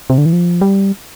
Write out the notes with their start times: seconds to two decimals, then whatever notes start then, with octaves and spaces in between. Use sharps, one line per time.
0.10 C3
0.18 D3
0.26 E3
0.33 F3
0.61 G3